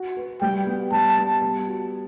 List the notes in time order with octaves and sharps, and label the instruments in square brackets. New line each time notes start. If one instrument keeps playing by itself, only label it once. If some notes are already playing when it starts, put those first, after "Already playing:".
Already playing: [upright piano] F#4
B4
[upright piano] G3 [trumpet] G5
[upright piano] B3
[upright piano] G3 [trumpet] A5
[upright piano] B3
G3
F#4